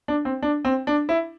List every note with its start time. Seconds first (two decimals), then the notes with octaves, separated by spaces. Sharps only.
0.08 D4
0.25 C4
0.42 D4
0.65 C4
0.87 D4
1.09 E4